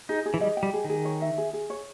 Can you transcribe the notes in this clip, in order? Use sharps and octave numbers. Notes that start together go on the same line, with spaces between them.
D#4 G#4
G#4
E3
G3 D#5
G5
G3
G#4
D#3 G#4
C#5
E5
G#4
G#4
C#5